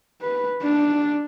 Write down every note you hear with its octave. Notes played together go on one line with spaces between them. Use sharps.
B4
D4